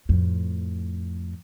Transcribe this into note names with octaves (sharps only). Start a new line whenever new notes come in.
F2 A2